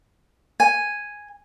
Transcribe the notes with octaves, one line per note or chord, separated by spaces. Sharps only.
G#5